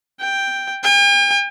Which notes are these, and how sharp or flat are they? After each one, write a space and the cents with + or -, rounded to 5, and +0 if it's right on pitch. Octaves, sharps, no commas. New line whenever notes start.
G5 +5
G5 +45